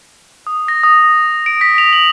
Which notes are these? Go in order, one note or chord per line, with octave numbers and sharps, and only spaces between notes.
D#6
A#6
D#6
D7
B6
F7
F#7